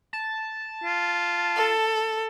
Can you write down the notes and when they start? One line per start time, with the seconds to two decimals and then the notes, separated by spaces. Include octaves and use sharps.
0.13 A5
0.84 F4
1.56 A4